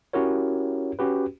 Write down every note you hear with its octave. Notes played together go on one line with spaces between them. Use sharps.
C#4 E4 F#4 G4 A#4 C#5
C#4 F#4 G4 B4